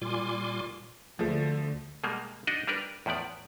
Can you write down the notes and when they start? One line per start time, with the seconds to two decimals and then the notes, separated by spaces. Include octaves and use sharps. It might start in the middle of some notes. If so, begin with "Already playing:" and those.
0.02 A#2 G3 F4 G#5 C6 D6
1.19 D2 D3 F3 A3
2.04 B2 G3 G#3 A#3
2.47 D4 D#4 F#4 D5 D#5
2.67 G3 D4 A#4 B4
3.06 E2 A2 F3 B3 D5